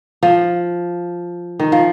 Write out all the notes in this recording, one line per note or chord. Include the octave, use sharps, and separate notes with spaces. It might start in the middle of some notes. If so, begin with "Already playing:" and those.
F3
D#3
F3